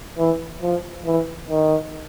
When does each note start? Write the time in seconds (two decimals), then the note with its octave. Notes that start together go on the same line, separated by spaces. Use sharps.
0.18 E3
0.62 F3
1.06 E3
1.50 D#3